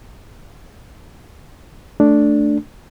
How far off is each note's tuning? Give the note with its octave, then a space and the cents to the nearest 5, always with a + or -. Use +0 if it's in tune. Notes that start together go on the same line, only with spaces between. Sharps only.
A3 +0 D4 +0